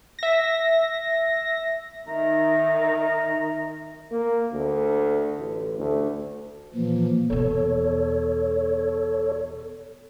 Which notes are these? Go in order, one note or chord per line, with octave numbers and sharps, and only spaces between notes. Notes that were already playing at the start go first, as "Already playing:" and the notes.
E5 A#6
D#3 E5 A#5
A#3
D2
A1
D2
A#2 E3 F3 A#3
E2 B2 A4 C#5